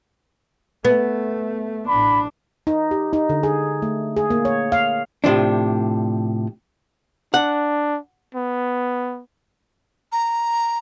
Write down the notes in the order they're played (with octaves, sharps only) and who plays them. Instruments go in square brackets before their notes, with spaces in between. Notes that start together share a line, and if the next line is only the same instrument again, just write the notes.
[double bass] A3 [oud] B3
[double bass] A1 D4 [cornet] B5
[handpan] D#4
G4
D#4
D3
G#4
A3
G#4
A#3
C#5
F5
[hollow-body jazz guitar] A2 C3 F3 D4
[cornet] D4 [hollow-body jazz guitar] F#5
[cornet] B3
[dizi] A#5